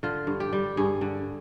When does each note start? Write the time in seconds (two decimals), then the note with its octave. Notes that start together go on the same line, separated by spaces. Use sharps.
0.03 D3 F4
0.27 G2
0.40 G4
0.53 G3
0.77 G2 G#4
1.01 D3